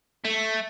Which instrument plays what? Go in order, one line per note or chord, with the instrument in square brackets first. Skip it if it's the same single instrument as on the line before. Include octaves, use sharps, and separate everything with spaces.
[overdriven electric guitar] A3